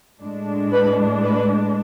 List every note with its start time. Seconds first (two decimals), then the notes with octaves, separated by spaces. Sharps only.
0.21 A2 G#3 D4
0.72 B4
1.23 B4